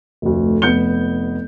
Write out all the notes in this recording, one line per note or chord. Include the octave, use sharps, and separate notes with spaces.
F1 D2
F1 B3 G6 C#7 G7